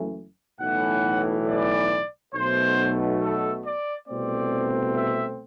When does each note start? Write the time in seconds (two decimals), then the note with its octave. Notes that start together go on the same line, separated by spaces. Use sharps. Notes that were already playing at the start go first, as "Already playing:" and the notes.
Already playing: F#1 F#2 E3 A3
0.60 B1 A2 E3 F#5
1.47 D5
2.34 B1 B2 A3 C5
3.21 A4
3.65 D5
4.08 C2 B2 A3 C4 D5
4.95 E5